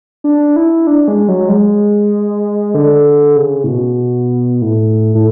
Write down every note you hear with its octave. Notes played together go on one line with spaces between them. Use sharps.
D4
E4
D4
G#3
F#3
G#3
D3
C#3
A2
B2
A2
A2